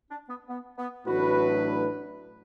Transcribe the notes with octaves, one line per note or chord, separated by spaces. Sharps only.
D4
B3
B3
B3
A1 A2 F#3 D4 F#4 B4